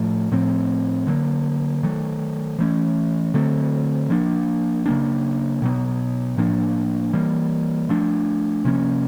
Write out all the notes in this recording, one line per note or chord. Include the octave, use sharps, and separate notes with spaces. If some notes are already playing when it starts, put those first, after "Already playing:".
Already playing: A2 F3 A3
A2 F3 A3 C4
D3 F#3 A#3
D#3 F#3 A3
E3 A3 C#4
D3 F#3 A3 C4
F3 A#3 D4
C#3 F#3 A#3 D4
B2 F#3 B3
A2 F3 A#3 D4
E3 G3 A#3
F3 A3 D4
C3 F3 A#3 C#4